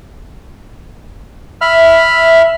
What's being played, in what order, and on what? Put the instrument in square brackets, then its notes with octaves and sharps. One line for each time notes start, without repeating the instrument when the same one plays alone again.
[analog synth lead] E5 [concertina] B5 F6